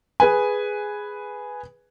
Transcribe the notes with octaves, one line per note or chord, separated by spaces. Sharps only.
G#4 B4 G#5